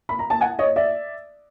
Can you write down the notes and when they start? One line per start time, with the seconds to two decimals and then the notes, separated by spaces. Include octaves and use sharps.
0.09 B5
0.19 A#5
0.30 A5
0.41 F#5 G#5
0.59 C#5 D#5
0.76 D5 E5